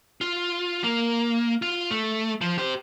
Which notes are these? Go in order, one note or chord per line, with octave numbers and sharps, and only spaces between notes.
F4
A#3
F4
A3
F3
G4 C5